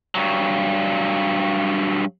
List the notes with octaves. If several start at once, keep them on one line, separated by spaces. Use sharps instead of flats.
G2 F#3